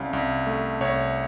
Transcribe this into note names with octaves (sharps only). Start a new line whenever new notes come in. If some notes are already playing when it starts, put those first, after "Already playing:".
Already playing: C2 C#4 F5
C2
A3
C2 C#5